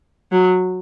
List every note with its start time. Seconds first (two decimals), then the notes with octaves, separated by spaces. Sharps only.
0.32 F#3